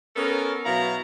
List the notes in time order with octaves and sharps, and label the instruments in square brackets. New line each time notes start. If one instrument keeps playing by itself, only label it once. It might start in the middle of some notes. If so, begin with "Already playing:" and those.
[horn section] B3 C#4 A4 A#4
B2 F#3 E4 F5 A#5